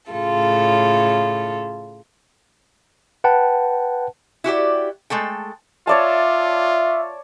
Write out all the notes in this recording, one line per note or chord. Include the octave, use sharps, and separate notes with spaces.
A2 C#3 F4 A4
B4 F#5 G5 A5
E4 F#4 G4 D5
G#3 A3 A4 G5
F4 C#5 D5 E5 A5